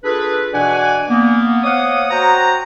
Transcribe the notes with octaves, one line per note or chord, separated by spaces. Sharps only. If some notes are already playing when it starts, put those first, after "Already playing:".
D4 F4 G#4 A4 B4
B2 E3 D4 D5 F#5 G#5
A#3 B3
C5 C#5 D#5 F5 F#5 D#6
F#4 C5 C#5 F#5 G5 A#5